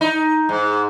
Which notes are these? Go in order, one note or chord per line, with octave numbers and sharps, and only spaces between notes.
D#4
G#2